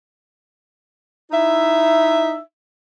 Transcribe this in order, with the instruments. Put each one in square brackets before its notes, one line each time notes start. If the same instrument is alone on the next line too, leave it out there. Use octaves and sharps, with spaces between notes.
[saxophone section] D#4 E4 E5